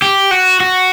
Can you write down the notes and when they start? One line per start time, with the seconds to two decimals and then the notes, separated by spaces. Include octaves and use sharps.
0.02 G4
0.31 F#4
0.60 F#4